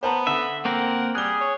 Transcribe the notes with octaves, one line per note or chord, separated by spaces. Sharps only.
B3 C5 A5 A#5
D3 E5
A#3 C4 A#4 F#5
G3 G#4 F#6 G7
C#5